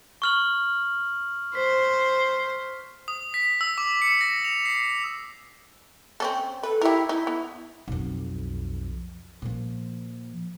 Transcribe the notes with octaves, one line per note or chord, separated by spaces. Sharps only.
C#6 F6 F#7
C5 B6
D#6
B6
E6
D6
C#7
A#6
F7
C7
C4 C#4 A4
A4 B4
G3 E4 A#4
D#4 E4
B3
B1 F2
A#2 F3